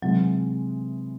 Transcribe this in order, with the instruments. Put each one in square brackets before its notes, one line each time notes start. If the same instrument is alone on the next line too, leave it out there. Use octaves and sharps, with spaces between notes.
[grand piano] C3 E3 G#3 [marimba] F#3